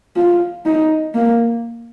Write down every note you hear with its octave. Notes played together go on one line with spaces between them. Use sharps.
F4
D#4
A#3